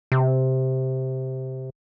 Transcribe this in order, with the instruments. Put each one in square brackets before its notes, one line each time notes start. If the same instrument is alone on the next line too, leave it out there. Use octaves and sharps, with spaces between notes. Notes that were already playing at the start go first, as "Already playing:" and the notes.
[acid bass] C3